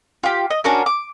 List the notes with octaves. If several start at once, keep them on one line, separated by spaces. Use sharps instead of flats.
F4 G4
D#5
C#4 D4 F#4 A#4
D6